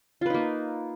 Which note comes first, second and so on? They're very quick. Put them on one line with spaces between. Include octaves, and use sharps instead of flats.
F4 B4 D#4 A#3